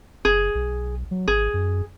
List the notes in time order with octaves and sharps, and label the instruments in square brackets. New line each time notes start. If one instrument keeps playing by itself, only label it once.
[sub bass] F#1 [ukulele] G#4
[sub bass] B1
F#3
[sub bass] G#1 [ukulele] G#4
[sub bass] F#2